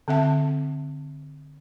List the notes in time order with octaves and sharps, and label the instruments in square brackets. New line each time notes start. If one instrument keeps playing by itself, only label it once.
[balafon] D3 C4 E5 A5